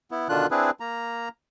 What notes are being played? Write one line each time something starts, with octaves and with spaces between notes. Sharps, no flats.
B3 E4
B2 D3 D#3 D4 F4 F#6
C4 D4 E4 G#4 B4
A#3 A#5